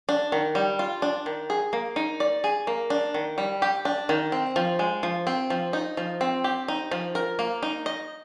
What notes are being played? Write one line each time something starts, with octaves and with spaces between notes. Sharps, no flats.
D4
D#3
G3
F4
D4
D#3
G#4
A#3
D#4
D5
G#4
A#3
D4
D#3
G3
G4
D4
D#3
C4
F3
G#3
F3
C4
F3
D#4
F3
C4
G4
D#4
F3
A#4
A#3
D#4
D#5